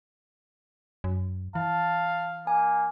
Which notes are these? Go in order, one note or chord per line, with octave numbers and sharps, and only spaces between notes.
F#2
E3 F5 A5
A#3 G#5